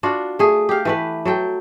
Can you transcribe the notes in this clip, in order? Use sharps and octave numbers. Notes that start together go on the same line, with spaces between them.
D4 F4 F#4
A3 G#4
G4 F5
E3 A3 B4
F#3 A4 G5